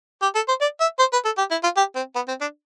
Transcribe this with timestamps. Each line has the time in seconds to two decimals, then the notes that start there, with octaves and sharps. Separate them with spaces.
0.22 G4
0.35 A4
0.48 C5
0.61 D5
0.81 E5
0.99 C5
1.13 B4
1.25 A4
1.38 G4
1.51 E4
1.64 F4
1.77 G4
1.95 C4
2.15 B3
2.28 C4
2.41 D4